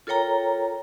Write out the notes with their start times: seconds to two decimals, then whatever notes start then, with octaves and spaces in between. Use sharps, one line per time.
0.07 F4 A4 A#4 C#5 G5 A#5